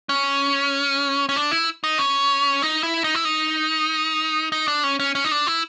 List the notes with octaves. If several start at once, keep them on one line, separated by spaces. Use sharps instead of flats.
C#4
C#4
D4
E4
D#4
C#4
D#4
E4
D#4
E4
D#4
D#4
D4
C#4
C#4
C#4
D#4
D4
E4